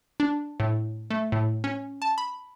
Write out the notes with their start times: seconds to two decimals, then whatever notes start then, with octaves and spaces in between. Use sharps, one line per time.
0.20 D4
0.60 A2
1.10 A3
1.32 A2
1.64 C#4
2.02 A5
2.18 B5